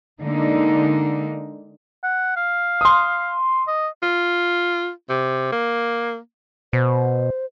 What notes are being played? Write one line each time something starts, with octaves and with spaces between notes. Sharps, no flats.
D3 G#3 A#3 D#4
F#5
F5
C6 D#6
D#5
F4
C3
A#3
B2 C5